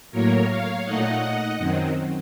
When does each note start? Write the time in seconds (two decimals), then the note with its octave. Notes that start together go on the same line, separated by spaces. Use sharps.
0.11 A2 F#3 A#3 A#4 C#5
0.48 C#5 F5
0.85 A#2 A3 D#4 D#5 F#5
1.57 F#2 D#3 F#3 C4